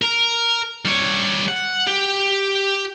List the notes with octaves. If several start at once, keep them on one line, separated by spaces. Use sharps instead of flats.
A#4
G3 C#5
F#5
G4